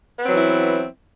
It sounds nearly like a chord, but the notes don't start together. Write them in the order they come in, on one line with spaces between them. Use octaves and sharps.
B3 C4 F#3 E3 E4